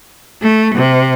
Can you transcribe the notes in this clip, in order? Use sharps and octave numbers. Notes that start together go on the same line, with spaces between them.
A3
C3